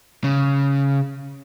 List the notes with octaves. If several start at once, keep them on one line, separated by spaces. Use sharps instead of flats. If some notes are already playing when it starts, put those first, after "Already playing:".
C#3